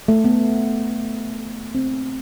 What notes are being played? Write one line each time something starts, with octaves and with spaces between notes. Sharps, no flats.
A3
B3
C4